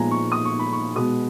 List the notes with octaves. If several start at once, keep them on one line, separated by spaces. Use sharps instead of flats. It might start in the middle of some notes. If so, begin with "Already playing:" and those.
Already playing: A#2 F3 G#3 B3 G#5 A#5
C#6
D#6
C#6
B5
C#6
B2 G#3 B3 D#6